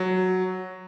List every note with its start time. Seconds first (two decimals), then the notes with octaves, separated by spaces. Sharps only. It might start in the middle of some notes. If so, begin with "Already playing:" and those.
Already playing: F#3